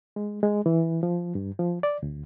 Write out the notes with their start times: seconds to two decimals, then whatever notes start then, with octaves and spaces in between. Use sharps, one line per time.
0.16 G#3
0.43 G#3
0.66 E3
1.03 F3
1.35 G2
1.59 F3
1.83 D5
2.03 D2